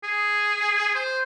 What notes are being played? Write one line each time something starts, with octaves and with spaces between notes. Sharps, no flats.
G#4
C5